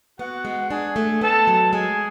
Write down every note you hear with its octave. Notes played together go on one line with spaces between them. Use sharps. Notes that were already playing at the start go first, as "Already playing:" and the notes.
B3 F#4 F#5
G#3
D4 G#4 G#5
A3
B3 A4 A5
F#3
G#3 G#4 G#5